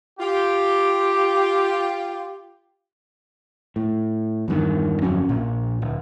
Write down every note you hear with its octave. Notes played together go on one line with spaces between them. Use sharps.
F4 G4
A2
E2 G2 D#3
G1 F2 F#3 C#4
A#1 A#2
D1